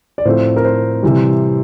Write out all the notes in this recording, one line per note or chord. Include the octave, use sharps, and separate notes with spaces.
D5
A2 F3 A3 C4 C5
A#4
C5
C3 E3 G3